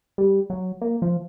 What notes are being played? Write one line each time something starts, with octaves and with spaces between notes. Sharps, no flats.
G3
F#3
A#3
F3